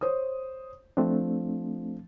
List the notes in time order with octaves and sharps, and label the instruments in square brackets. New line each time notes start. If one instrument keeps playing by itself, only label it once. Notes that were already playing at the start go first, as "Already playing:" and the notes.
[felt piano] C5 C#5 D#6
[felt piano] F3 [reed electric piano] A3 C4 D4